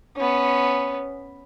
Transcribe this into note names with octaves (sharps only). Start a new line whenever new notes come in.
B3 C#4